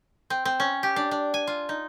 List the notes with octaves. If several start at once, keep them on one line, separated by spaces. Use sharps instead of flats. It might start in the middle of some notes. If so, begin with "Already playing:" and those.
C4
C4
C#4
G4
D4
D4
G#5
F4
D#4